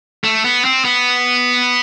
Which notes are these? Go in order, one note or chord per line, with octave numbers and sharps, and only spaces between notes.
A3
B3
C4
B3